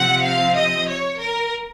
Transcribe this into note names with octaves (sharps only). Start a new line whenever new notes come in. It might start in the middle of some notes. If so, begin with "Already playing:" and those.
Already playing: C3 F3 C4 F#5
F5
D#5
C#5
A#4